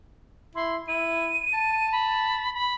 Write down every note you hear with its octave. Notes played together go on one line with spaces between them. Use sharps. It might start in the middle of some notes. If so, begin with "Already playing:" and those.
E4 C6
E4 D#7
A5
B5
B5